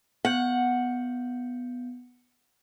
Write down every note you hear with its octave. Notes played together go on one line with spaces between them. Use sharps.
B3 F#5 G6